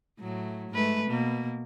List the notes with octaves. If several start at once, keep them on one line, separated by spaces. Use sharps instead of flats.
A2 F#3 A3
G#2 A3 B4
B2 A#3